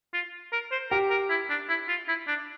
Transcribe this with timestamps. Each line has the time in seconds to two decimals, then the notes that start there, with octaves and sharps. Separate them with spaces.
0.14 F4
0.52 A#4
0.72 C5
0.91 G4 A#4
1.10 A#4
1.30 E4
1.50 D4
1.69 E4
1.89 F4
2.08 E4
2.28 D4